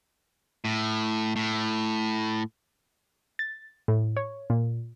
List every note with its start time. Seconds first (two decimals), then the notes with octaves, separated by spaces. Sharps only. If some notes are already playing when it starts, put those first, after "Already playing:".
0.65 A2
1.36 A2
3.39 A6
3.88 A2
4.17 C#5
4.50 A#2